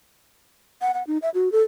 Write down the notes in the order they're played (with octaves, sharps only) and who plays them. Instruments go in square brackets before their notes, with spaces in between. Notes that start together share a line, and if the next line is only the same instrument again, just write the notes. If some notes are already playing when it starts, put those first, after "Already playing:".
[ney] F#5
F#5
D#4
E5
F#4
A4